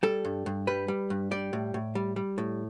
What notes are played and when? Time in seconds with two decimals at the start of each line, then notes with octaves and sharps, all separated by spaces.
0.03 G3 A4
0.25 G2
0.46 G2
0.67 G3 B4
0.88 G3
1.10 G2
1.31 G3 D5
1.53 A2
1.74 A2
1.95 G3
2.16 G3
2.38 A2